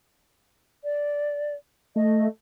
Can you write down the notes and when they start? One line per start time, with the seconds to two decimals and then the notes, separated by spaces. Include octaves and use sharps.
0.84 D5
1.96 A3 D#5